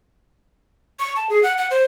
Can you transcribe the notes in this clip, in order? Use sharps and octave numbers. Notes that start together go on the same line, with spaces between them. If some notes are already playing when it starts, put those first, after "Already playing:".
C#6
A5
G#4
F#5
F#5
C5